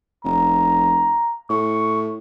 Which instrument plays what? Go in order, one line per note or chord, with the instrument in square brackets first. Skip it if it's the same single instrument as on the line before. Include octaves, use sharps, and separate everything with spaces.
[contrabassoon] F1 [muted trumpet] A#5
[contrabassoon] A2 [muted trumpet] C#6